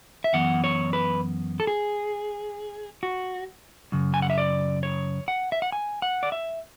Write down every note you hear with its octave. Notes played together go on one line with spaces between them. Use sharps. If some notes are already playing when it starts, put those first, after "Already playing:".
E5
F#2 E3 B3 F#5
C#5
B4
A4
G#4
F#4
F#2 C#3
G#5
F#5
E5
D5
C#5
F#5
E5
F#5
G#5
F#5
D5
E5